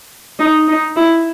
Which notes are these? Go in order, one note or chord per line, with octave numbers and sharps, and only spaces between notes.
D#4
D#4
E4